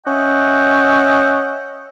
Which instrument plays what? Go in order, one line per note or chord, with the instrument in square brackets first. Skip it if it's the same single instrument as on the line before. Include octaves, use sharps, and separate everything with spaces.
[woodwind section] C#4 D#5 E5 F#5 G5